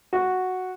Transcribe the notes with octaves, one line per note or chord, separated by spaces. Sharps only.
F#4